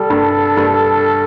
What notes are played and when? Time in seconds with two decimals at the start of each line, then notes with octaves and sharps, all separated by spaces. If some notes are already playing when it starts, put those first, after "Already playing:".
Already playing: G3 A4
0.10 G2
0.57 G2